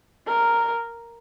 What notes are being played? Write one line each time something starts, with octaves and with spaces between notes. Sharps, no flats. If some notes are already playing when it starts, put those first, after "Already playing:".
A#4